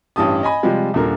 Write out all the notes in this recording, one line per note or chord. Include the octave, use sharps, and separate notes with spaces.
A1 G2 E3 G4 A5 D#6
D#5 G#5 B5
C3 F3 G3 G#3 G4
D#1 A#2 D3 A#4